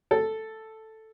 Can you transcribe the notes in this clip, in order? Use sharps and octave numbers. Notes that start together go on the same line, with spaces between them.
A4